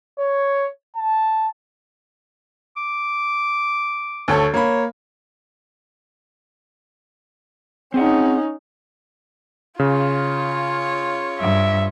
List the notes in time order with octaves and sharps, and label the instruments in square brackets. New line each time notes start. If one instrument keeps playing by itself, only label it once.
[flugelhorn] C#5
A5
[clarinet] D6
[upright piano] D2 A4 C#5
[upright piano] A#3 B5 [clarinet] C#5
[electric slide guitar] C4 G#4 F#5 [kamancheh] C#4 D#4
[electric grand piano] C#3 [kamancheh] F4 C#5
[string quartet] G2 [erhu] E5